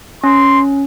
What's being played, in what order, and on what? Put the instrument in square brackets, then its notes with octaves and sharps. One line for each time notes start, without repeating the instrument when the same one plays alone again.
[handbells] C#4 [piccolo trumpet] C6